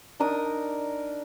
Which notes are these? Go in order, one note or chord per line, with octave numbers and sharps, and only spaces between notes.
D4 D#4 A#4 D#6